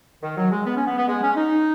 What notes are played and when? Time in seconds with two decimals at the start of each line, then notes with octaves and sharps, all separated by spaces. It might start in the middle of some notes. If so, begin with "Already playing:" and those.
0.23 D#3
0.37 F#3
0.51 G#3
0.65 B3
0.76 C#4
0.86 B3
0.97 B3
1.08 G#3
1.22 C#4
1.36 D#4